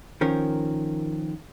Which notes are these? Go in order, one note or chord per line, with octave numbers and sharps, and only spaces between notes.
D#3 F3 C#4 A#4